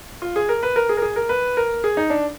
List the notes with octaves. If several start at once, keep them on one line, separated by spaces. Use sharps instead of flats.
F4
G#4
A#4
B4
A#4
G#4
A#4
G#4
A#4
B4
A#4
G#4
D#4
D4